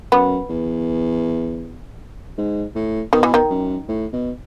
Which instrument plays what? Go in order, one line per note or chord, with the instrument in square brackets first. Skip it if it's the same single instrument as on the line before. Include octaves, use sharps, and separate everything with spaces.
[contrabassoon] F#2 [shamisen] B3
[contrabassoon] E2
G#2
A2
[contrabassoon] B2 [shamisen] D#3
[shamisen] E3
D#3
[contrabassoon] F#2
A2
B2